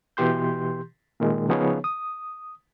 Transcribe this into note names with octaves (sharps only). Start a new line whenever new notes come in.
B2 E3 G4 C6 G6
A#2 D#3 G#3
C#3 F3 B3 D#4 G#4 C#5
D#6